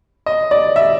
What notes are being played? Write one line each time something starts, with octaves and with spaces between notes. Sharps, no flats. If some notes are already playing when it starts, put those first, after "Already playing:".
D#5
D5
E5